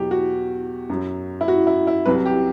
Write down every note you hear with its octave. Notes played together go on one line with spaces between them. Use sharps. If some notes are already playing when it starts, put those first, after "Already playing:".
Already playing: E2 B2 F#3 G4
F#4
F#2 F#3
E4
F#4
E4
E4
C2 C3 F#3 B4
G4